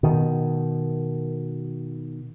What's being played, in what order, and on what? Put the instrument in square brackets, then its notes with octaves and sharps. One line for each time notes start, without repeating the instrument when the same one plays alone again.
[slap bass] B2 D#3